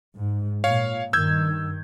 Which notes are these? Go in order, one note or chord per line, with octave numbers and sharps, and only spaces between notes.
G#2
A#2 C#5 F5
G2 D#3 E6 G6 G#6